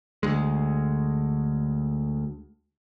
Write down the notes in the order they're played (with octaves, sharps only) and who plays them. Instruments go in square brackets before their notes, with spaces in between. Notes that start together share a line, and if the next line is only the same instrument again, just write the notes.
[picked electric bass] D2 G#3